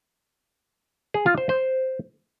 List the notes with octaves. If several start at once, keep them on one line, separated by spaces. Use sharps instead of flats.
G#4
F4
C5
C5